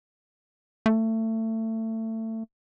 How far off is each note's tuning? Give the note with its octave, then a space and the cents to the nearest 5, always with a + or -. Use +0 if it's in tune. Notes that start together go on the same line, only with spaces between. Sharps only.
A3 +25